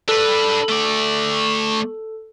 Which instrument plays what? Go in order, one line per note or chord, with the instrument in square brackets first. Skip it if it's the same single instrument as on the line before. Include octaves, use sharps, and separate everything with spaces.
[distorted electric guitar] D4 B4 [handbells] A4
[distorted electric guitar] A3 D5